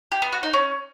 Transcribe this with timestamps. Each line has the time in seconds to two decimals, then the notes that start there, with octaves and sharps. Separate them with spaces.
0.12 G4
0.22 B3
0.32 F#4
0.43 D#4
0.53 C#4